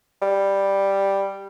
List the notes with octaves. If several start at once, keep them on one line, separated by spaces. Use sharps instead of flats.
G3